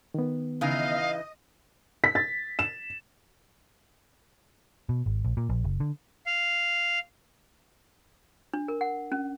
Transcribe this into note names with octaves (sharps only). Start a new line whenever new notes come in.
D#3 B3
C#3 E3 D#4 D#5 F5
B6
A6
E7
B2
G#1
A#1
A#2
A#1
F#1
D3
F5
D4
A#4
F#5
C#4